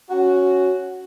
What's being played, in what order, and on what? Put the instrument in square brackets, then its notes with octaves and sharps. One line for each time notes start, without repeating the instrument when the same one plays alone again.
[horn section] C#4 F#4